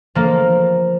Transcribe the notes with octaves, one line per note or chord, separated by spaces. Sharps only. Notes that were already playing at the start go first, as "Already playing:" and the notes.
F3 A#3